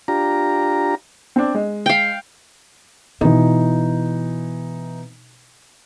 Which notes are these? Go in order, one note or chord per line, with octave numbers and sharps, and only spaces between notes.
D4 F4 G4 A#5
C4 D4
G#3
F5 G5
B2 E3 D#4